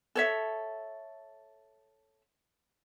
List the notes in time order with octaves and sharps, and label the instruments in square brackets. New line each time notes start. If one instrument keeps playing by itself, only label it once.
[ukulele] A4 C#5 E5